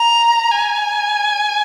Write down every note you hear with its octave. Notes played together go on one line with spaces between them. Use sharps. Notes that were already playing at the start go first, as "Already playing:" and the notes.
Already playing: A#5
G#5